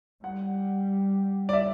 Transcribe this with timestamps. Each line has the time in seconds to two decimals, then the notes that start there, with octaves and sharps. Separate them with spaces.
0.24 G3 F#5
1.49 D5
1.53 E5